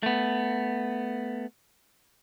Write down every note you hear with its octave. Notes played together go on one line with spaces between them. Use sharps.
A3 B3